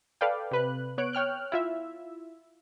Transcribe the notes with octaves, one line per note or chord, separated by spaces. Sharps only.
A4 B4 D5 F5 G5
C3 B4 F#6
B3 C#5 F#6 D7
C#5 G5 F6 F#6
E4 F4 E5